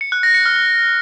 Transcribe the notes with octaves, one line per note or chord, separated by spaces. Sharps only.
C#7
F#6
A#6
C#7
F6